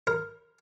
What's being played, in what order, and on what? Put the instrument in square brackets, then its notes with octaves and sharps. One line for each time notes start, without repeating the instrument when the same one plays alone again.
[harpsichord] A#4